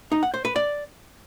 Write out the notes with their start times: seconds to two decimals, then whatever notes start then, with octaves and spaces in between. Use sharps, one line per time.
0.12 D#4
0.23 F#5
0.34 C5
0.45 B4
0.56 D5